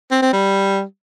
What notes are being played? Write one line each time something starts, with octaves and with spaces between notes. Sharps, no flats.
C4
C4
G3